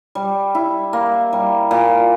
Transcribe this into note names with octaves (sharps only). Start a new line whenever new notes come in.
G3
E4
A#3
G3
A#2